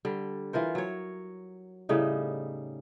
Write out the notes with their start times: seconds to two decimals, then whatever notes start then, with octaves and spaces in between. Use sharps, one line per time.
0.05 D3 G3
0.53 E3 F4 A#4 C5
0.75 F#3 C#5
1.89 A2 C#3 G3 D#4